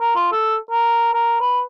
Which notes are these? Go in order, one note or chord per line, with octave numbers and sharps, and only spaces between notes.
A#4
F4
A4
A#4
A#4
B4